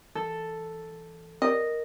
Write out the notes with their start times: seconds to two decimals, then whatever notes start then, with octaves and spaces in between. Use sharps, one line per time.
0.15 E3 A4
1.42 C4 G4 A#4 D5 D#5